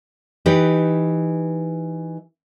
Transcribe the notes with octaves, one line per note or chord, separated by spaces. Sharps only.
E3 D#4 G4 B4